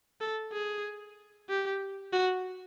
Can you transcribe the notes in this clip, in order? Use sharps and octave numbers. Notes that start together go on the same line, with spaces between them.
A4
G#4
G4
F#4